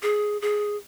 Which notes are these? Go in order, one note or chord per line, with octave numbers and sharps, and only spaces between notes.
G#4
G#4